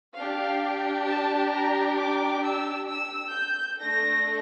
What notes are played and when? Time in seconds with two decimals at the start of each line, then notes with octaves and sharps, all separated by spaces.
0.15 D4 G4 F5
1.07 A5
1.51 A#5
1.97 D6
2.43 E6
2.89 E6
3.34 G6
3.79 A3 D4 A4 A#6